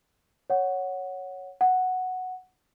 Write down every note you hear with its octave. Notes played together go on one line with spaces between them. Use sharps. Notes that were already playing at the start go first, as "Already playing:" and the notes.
C#5 F#5
F#5